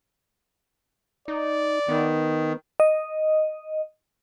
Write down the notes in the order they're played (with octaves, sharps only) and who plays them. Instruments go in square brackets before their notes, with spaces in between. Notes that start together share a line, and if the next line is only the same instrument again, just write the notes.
[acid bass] D#4 [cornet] D5
[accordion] D#3 [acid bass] B3
[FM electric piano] D#5